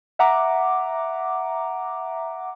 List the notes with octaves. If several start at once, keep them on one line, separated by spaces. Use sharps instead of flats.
E5 F#5 A#5 D6